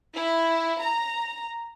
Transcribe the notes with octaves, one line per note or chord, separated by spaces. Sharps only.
E4
A#5